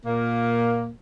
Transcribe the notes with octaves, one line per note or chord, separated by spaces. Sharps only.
A#2 A#3